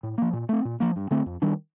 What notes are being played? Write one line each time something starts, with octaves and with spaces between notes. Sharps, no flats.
A2
F3 A#3
A#2
A3 C4
A#2
F3 A#3
G2
D3 A3 C4
F2
D#3 G3 D4